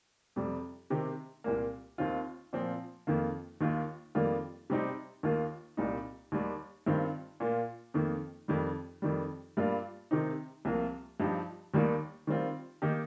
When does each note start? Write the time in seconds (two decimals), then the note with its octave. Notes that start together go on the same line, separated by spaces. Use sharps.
0.36 F2 C3 G3
0.90 C3 D#3 C4 G4
1.44 C2 A#2 A#3
1.98 D#2 D#3 C4 F4
2.53 A#2 F3 C4
3.07 F2 D#3 A#3 F4
3.61 D#2 D#3 A#3 F4
4.15 F2 D#3 G3 A#3 F4
4.70 C3 G3 C4 D#4 G4
5.23 D#2 D#3 A#3 F4
5.77 C2 A#2 G3 D#4
6.32 D#2 D#3 G3
6.86 G2 D#3 C4 F4
7.40 A#2 A#3 F4
7.94 F2 D#3 A#3
8.48 F2 D#3 G3
9.02 F2 D#3 G3
9.57 G2 G3 A#3 F4
10.11 C3 D#3 C4 D#4
10.65 C2 C3 F3 A#3 F4
11.20 G2 F3 D#4 G4
11.74 D#2 D#3 G3 A#3 D#4
12.27 D#3 G3 C4 F4
12.82 D#3 A#3 D#4 G4